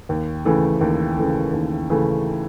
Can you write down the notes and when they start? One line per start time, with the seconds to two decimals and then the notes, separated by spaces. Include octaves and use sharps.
0.09 D#2
0.45 C#3 E3 A3
0.81 D#2
1.17 C#3 E3 A3
1.53 D#2
1.90 C#3 E3 A3